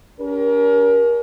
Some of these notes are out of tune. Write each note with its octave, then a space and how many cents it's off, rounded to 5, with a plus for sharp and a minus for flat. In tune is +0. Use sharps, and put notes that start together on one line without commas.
C#4 +45 G4 +0 A#4 +25